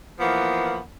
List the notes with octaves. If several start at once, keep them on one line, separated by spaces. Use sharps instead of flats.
E3 F3 A#3 B3